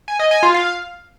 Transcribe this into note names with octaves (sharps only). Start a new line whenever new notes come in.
G#5
D#5
G#5
F4
F5